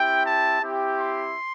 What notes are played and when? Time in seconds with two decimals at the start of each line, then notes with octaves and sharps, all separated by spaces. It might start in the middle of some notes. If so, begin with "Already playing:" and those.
Already playing: C4 E4 G4 G5
0.24 A5
0.61 C4 E4 G4
0.99 C6